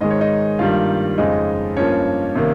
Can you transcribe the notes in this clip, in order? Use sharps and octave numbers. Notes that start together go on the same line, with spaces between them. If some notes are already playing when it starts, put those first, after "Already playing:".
G#2 D#3 G#3 D#5
C#5
D#4 D#5
G2 D#3 G3 A#3 F4 F5
F2 C#3 G#3 D#4 D#5
G2 F3 A#3 C#4 C#5
C3 D#3 A#3